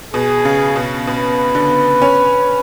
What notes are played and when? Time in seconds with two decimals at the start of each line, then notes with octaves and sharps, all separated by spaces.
0.14 B2 G#4
0.45 C#3
0.76 B2
1.07 B2 B4
1.55 D3
2.02 C#4